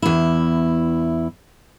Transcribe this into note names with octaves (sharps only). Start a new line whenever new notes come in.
E2 E4